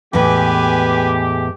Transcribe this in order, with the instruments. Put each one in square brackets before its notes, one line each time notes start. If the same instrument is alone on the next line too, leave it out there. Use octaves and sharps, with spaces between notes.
[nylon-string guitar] E2 A2 [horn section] G#3 G4 [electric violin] B4 G#5